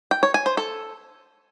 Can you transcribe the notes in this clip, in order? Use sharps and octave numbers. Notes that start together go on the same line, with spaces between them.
G5
C#5
G#5
C5
A4